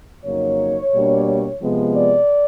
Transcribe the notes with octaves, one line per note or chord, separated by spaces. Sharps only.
F2 C#3 F#3 A#3 D#4 C#5
B2 G3 A#3 D4
C3 F3 G#3 B3
D5